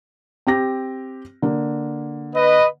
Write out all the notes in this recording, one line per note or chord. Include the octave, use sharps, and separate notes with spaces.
C4 G4 A#6
D3 A#3
B4 D#5